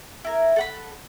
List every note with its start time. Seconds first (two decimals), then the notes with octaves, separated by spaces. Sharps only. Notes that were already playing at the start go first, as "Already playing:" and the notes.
0.25 E4 A#4
0.56 A4 F#5 B5